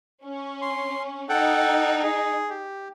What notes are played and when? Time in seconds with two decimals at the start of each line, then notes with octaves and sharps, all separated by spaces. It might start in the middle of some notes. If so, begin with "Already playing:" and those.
0.23 C#4
0.62 C6
1.29 D#4 A4 F#5 G5
2.03 G#4
2.50 G4